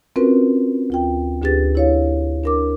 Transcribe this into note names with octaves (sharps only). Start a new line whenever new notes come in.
C4 C#4 F4 F#4 A#4 B4
D2 F4 G5
D2 D4 G4 G#4 B4 A6
E4 C#5 F5
D4 A#4 D6